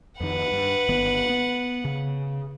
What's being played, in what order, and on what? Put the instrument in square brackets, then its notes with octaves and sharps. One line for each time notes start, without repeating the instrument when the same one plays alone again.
[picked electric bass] F2 D#3 [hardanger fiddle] B4 F#5
[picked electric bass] G2
G1 D#3 B3
B3
C#3